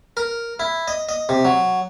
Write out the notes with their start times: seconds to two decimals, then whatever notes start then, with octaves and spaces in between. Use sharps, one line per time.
0.17 A#4
0.60 E4
0.88 D#5
1.09 D#5
1.29 C3
1.45 F#3